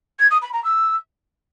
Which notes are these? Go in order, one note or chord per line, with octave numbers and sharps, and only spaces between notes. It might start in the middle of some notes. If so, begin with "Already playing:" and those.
G#6
D#6
B5
A#5
E6